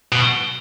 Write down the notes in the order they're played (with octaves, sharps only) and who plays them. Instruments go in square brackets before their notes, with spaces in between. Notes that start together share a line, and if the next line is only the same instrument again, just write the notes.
[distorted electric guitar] B2